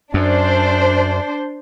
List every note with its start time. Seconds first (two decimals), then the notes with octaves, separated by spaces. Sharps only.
0.14 F#2 D4 C5